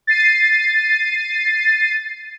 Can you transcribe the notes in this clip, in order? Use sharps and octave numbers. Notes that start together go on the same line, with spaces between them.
A6 C7 D#7